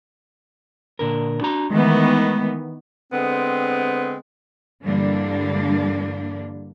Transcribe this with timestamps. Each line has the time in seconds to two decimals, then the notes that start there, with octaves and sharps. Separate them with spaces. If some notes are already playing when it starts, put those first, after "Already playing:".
0.99 A#2 D3 A#4
1.41 D4 F#4 A#5
1.71 D#3 E3 G#3 A3 B3
3.13 D3 G#3 B3 C4
4.84 G2 D3 E3 G3 A#3 D4